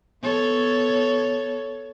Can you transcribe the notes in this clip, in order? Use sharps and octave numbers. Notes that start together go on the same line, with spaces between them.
B3 A4 C#5